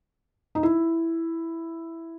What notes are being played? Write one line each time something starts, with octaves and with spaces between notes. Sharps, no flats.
D#4
E4